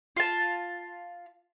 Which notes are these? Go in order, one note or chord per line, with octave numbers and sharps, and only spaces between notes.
F4 A5